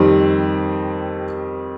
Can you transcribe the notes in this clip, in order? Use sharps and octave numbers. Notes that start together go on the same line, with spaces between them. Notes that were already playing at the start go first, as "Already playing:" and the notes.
Already playing: F2 D#3 G3 C4